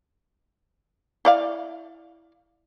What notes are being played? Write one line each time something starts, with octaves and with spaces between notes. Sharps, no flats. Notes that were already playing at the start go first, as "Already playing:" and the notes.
E4 D5 F5